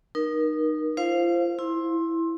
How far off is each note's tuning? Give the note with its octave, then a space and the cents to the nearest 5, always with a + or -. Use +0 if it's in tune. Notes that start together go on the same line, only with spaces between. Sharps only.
D#4 -20 A#4 +30
F4 -40 C5 +0 F5 +0
E4 +0 C6 +20